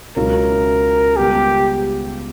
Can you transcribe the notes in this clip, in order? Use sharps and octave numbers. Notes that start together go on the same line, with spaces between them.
C#2 B2 F#3 C#4 E4 A#4
C#2 C#3 G3 B3 G4